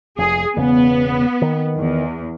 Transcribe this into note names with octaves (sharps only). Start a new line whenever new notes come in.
F1 G#4
E1 C#3 B3
D#3
E2